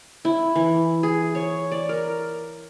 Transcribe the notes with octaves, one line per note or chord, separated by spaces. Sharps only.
E4
E3
G#4
C#5
D5
A#4